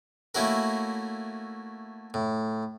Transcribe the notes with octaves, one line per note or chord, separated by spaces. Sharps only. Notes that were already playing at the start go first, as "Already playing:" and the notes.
A3 A#3 C#4 E4 F#4 A#4
A2